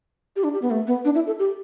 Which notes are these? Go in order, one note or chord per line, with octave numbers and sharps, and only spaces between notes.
G4
D4
G4
B3
A3
B3
D4
E4
A4
G4